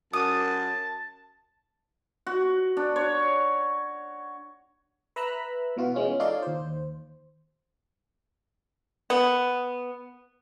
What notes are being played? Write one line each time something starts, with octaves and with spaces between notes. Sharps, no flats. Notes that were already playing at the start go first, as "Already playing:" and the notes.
F#2 A5 D#6
F#4
D4
C#5
B4 E5 A#5 B5 E6 F#6
B2 E3 F4 F#4
E3 G#3 C#4 F4
D#4 F4 A4 C#5 D5 C6
D#2 C5
B3